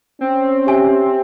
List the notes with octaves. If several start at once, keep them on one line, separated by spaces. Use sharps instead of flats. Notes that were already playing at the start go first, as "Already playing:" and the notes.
C4 C#4
G4 E5 G#5